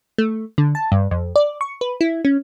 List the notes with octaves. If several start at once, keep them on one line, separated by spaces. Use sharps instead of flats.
A3
D3
A5
G2
F2
D5
C#6
B4
E4
C#4